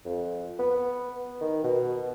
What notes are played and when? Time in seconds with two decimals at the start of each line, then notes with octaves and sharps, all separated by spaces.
0.05 F2
0.59 B3
1.41 D#3
1.64 B2